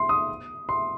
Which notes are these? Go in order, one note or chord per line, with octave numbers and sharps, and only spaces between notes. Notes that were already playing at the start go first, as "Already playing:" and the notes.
Already playing: C6
D#6
C6